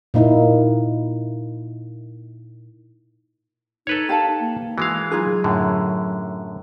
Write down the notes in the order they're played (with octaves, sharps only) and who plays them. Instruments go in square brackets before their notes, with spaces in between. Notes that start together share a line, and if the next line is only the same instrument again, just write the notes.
[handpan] A#2 A#3 D#4 E4
[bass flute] D#4 [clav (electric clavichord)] A4 B4 C#5
[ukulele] G4 F5 A5
[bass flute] A#3
[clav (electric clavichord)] E3 G#3 F5 [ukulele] F#4
[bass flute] F#3 [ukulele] D#4 F4 G#4
[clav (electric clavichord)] F#2 A2 D3